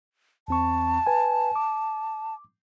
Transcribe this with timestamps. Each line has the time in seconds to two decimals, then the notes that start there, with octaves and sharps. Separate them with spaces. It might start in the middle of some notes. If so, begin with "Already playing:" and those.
0.48 E2 C4 A5 C#6
1.07 B4 G#5
1.56 D6